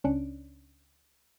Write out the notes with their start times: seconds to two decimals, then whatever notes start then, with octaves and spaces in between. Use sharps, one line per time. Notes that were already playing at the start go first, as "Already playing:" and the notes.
0.04 C#2 C#4 D4 F#6 C#7 D7